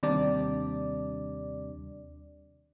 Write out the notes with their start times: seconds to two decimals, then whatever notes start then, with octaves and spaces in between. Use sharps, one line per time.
0.03 D#2 C3 G3 D4 D5